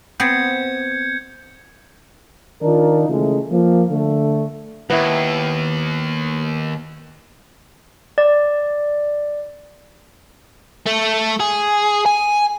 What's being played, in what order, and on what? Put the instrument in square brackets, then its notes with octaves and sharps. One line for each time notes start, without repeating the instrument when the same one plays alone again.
[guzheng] B3 C4 [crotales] G6 G#6 C#7
[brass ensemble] D#3 D4 D#4 F4 A#4
C#3 E3 G#3 A3
F3 A#3
D3 A3
[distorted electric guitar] D#2 [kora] B3 E4
[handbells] D5
[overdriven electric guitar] A3
G#4
G#5